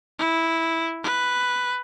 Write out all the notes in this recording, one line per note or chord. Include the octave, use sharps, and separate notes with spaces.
E4
B4